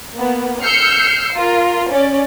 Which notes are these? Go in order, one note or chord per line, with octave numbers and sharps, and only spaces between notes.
A#3 B3
E6 F6 G6 C7 C#7
F4 A#4
C#4 D5